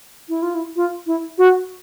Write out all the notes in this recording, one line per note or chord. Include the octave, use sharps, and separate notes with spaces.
E4
F4
E4
F4
E4
F#4